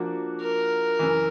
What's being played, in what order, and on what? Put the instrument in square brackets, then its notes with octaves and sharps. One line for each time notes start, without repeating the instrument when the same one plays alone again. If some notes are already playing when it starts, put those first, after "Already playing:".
Already playing: [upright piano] F3 A#3 D4 F#4
[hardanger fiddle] A#4
[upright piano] F#2 C#3 E3